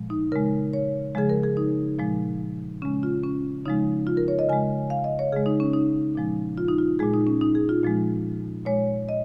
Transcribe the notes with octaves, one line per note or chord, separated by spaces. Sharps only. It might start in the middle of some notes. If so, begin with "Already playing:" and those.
Already playing: A#2 F3 G#3
D#4
C#3 G#3 A#4
C#5
C#3 F3 G#3 G#4
A#4
G#4
D#4
A#2 F3 G#3
C#3 G#3 C#4
F4
C#4
C#3 F3 G#3 D#4
F4
A#4
C#5
D#5
C#3 G#3 G#5
F5
D#5
C#5
C#3 G#3 G#4
D#4
C#4
D#4
A#2 F3 G#3
F4
D#4
F4
A#2 G#3 G#4
D#4
C#4
D#4
G#4
F4
A#2 F3 G#3
A#2 G#3 C#5
D#5